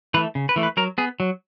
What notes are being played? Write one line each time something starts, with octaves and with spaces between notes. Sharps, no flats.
E3 A3 B4
C#3
B4
E3 A3
B4
F#3 A#4
B3 G#4
F#3